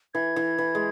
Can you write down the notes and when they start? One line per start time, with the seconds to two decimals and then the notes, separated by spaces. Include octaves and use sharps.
0.14 E3 G#6
0.36 E3
0.58 E3
0.75 G#3